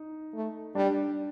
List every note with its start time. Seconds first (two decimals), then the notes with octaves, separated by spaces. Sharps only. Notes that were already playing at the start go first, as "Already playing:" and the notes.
Already playing: D#4
0.34 A3
0.75 G3 D4